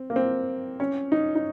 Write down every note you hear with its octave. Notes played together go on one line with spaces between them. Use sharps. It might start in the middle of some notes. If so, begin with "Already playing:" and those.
Already playing: C4
A#3
C4
C#4
D#4
D#4